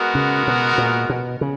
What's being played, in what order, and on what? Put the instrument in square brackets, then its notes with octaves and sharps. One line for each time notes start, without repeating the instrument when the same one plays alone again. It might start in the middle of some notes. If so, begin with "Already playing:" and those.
Already playing: [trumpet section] G#3 B3 F#4 A#4
[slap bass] C#3
B2
A#2
B2
C#3